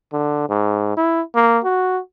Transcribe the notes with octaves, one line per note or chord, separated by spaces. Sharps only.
D3
G#2
E4
A#3
F#4